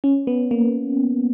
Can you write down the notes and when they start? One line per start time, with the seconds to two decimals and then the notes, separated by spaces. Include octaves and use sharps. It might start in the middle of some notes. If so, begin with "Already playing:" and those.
0.04 C#4
0.27 B3
0.51 A#3